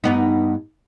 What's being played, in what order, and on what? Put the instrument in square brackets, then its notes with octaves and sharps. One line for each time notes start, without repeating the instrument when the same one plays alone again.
[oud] G2 B3 D#4